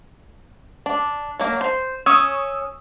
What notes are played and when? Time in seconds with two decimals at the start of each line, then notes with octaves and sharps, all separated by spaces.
0.86 D4
1.39 F#3 A#3
1.61 C5
2.06 C#4 C#6 D#6 E6